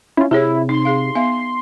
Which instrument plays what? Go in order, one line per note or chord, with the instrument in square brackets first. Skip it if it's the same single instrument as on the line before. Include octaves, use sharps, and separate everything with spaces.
[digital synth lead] C#4 [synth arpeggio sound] E4 F4
[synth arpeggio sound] C3 [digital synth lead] E4 [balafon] G4 G#4 C#5
[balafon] D#4 [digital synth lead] C6
[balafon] G#4 F5
B3 E5 F5